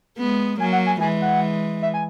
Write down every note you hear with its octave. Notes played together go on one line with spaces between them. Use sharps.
G#3 B3
F#3 A#3 G#5
F#5
G#5
E3 G#3 G#5
F#5
E5
G#5